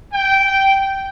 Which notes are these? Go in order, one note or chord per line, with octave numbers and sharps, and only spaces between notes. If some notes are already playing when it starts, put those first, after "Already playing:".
G5